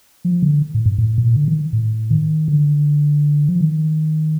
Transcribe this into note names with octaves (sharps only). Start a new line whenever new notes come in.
F3
D3
A2
G2
A2
A#2
D3
D#3
A2
D#3
D3
F3
D#3